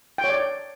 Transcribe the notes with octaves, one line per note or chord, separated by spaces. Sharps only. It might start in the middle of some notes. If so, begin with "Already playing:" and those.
G5
C#5
D5